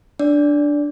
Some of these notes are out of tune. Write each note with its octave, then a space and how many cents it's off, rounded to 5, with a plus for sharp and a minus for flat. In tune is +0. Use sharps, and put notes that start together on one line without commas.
D4 +0 D5 -15